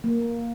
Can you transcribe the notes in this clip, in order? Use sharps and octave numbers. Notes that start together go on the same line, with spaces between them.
A#3